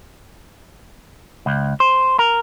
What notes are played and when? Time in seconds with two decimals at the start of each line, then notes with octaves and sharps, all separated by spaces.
1.46 C#2
1.80 C5
2.19 A#4